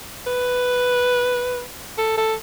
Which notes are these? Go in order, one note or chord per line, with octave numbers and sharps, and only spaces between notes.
B4
A4
A4